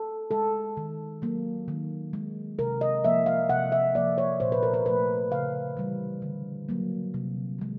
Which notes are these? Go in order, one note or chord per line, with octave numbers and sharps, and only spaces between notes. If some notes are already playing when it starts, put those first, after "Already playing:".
Already playing: A4
G#3 A4
D#3
F#3 A#3
D#3
G#3
C3 A#4
D#5
F3 A#3 E5
F5
C3 F#5
E5
F3 A#3 D5
C#5
A#2 C5
B4
A#4
B4
F3 A3 B4
C#3 F5
E3 G3
D3
F#3 A#3
C3
D#3 G#3